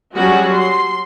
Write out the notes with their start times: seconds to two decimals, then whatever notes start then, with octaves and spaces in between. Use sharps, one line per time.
0.15 F#3 G3 C#4 F#4 G#4
0.52 C6